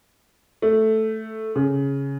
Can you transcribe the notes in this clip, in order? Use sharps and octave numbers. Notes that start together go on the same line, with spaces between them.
A3
C#3